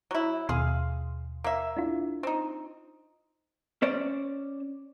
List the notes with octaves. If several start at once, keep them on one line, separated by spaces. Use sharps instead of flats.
F#3 E4
D#2 B2 G#4 F5 C6
A#3 E5
D4 E4 F4
C4 D#4
C#4 C5 D5